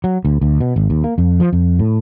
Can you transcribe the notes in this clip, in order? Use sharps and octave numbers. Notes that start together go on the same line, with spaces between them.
F#3
D2
D2
B2
G#1
D#2
A#3
F2
F3
F2
A2